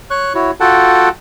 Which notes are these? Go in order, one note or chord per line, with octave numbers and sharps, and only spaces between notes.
C#5 C#6 F#6
E4 F#4 C#5
F4 F#4 A4 F#5 G5 A5